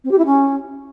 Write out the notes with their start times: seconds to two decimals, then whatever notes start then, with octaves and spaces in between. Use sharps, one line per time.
0.04 C4
0.11 G4
0.18 E4
0.25 C#4